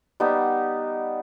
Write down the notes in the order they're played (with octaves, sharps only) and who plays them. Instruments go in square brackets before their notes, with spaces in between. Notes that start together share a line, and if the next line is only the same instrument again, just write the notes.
[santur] G3 B3 D#4